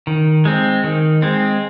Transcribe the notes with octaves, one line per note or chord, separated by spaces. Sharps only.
D#3
G#3 C4
D#3
G#3 C4